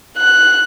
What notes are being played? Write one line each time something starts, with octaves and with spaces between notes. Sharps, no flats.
F#6